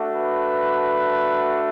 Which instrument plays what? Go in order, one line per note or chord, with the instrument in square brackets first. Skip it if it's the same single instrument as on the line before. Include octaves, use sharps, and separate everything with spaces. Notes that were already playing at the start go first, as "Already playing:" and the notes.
Already playing: [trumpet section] A3 D4 F#4
B4